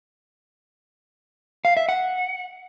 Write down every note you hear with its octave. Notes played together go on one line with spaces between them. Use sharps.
F5
E5
F#5